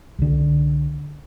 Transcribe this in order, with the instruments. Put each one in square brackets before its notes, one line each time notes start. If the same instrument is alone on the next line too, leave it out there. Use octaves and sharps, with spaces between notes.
[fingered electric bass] C2 D3